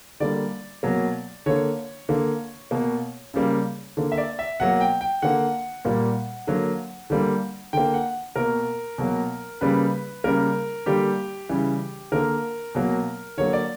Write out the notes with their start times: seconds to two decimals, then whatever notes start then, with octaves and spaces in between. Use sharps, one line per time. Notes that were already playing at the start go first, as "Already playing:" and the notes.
0.20 D3 G3 A#3 D5
0.83 B2 F#3 A#3
1.46 D3 A#3 C#5
2.09 D3 A#3
2.71 B2 A#3
3.34 C#3 G3 A#3
3.97 D3 A#3
4.12 E5
4.18 D5
4.39 E5
4.60 B2 F#3 A#3 F#5
4.81 G5
5.01 G5
5.22 D3 A#3 F#5
5.85 A#2 G3 A#3
6.47 D3 F#3 A#3
7.10 D3 G3 A#3
7.73 D3 A#3 G5
7.94 F#5
8.36 B2 A#3 A#4
8.98 B2 F#3 A#3
9.61 C#3 G3 A#3 B4
10.24 C#3 G3 A#3 A#4
10.86 D3 G3 A#3 G4
11.49 C#3 E3 G3
12.12 D3 A#3 A#4
12.75 B2 F#3 A#3
13.37 D3 F#3 A#3 C#5
13.53 D5